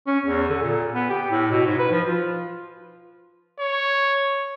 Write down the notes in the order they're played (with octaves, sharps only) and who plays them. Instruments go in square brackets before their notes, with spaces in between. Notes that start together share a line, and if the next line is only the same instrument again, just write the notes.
[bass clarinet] C#4
E2
D3
A#2
B3
G4
A2
B2
G#2
B4
F3
F4
[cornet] C#5